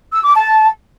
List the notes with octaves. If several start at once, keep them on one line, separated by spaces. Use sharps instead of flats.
E6
D6
A5